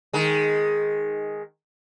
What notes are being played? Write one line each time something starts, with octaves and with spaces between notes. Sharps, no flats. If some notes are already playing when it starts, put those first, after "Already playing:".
D#3 G#3